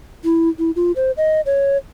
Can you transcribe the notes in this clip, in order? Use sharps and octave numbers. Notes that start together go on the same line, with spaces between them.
E4
E4
F4
C5
D#5
C#5